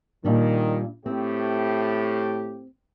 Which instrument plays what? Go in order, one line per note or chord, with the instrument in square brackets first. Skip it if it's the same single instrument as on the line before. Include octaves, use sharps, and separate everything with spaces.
[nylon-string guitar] A#2 G3 D4 [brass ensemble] D#3
[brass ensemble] A2 G4 [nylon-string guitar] C4